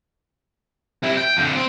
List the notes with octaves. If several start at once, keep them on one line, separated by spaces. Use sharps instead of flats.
C3 E4
G5
F2 D3
C4